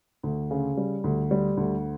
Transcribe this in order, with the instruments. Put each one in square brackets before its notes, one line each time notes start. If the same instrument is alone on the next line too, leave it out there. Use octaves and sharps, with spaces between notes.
[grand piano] D2
C#3
G3
D2
G3
D2